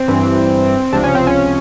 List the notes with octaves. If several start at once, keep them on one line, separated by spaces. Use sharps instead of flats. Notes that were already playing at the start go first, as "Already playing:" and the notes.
Already playing: C4
G2 E3
C#2 C3 F3 D4
C#4
C4
C#4